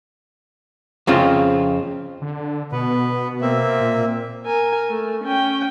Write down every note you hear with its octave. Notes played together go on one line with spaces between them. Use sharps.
F2 C#3 C4 F4
D3
B2 B3 B4
A#3 C4 E5
A#2
A#4 G#5
A3
C#4 G5